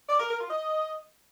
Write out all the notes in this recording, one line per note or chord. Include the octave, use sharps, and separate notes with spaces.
D5
A#4
A#4
F4
D#5